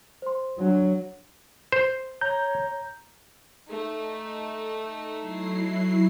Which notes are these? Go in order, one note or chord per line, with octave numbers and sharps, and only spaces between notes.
C5 C6
F#3 D4 F#4
C5
C#5 A#5 G6
A3 D#4
F#3 E4 C7